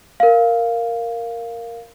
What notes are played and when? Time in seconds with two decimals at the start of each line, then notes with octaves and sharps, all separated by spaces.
0.20 A#4 F5